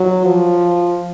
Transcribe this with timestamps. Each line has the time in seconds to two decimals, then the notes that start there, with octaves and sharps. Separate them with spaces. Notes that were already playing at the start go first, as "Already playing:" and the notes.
Already playing: F#3
0.25 F3